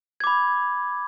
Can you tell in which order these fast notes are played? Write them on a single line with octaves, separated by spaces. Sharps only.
G#6 D6 B5